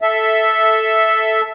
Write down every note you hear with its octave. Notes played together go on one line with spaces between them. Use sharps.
A4 E5